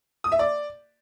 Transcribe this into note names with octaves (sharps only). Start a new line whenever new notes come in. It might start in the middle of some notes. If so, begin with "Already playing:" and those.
D#6
E5
D5